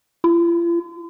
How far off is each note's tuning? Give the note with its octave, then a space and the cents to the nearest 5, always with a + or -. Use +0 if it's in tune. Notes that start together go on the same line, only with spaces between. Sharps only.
F4 -45